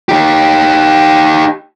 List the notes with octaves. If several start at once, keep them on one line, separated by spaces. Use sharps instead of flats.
D#4 G4